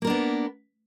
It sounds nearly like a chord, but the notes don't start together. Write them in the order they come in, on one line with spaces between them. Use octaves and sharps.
A#3 A#4 D4 B3